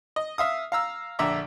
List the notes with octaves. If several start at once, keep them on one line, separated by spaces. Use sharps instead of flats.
D#5
E5 F5 D#6
F5 A#5 E6
A#1 D3 E5 A#5 D6